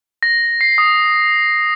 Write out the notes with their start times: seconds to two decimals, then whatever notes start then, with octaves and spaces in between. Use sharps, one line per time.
0.23 A#6
0.61 C7
0.78 D#6